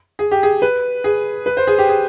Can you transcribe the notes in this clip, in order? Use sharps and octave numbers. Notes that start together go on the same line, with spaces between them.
G#4
G4
G#4
B4
G#4
B4
C5
G#4
G4
G#4